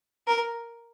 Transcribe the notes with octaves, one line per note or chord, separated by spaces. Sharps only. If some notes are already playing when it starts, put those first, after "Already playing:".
A#4